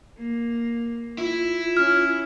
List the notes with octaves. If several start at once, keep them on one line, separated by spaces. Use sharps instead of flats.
A#3
E4 F4
C#4 F6